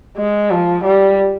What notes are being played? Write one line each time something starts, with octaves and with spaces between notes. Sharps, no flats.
G#3
F3
G3